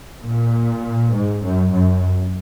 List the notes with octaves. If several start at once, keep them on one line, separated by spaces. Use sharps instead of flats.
A#2
G#2
F#2
F#2